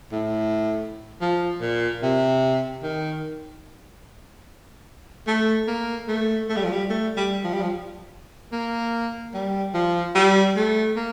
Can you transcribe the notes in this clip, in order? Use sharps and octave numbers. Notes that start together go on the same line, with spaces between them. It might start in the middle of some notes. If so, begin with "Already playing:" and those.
A2
F3
A#2
C3
D#3
A3
A#3
A3
A3
G3
F3
G3
A3
G3
F3
G3
F3
A#3
G3
F3
G3
A3
A#3